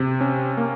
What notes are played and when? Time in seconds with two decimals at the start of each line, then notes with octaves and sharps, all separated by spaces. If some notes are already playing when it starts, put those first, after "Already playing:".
Already playing: C3
0.21 C#4
0.57 A#3